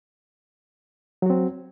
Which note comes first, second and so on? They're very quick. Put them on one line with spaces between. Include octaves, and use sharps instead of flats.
F#3 F#4 C4